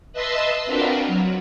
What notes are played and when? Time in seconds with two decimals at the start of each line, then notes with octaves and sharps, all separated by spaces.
0.13 B4 D#5 E5 A5 C6 E6
0.66 C4 D4 F4 F#4 A#4 B4
1.07 F#3